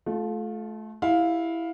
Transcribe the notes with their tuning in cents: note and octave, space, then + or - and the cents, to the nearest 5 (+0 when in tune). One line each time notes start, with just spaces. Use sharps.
A3 -25 F4 +20
E4 +0 G4 +25 F5 +10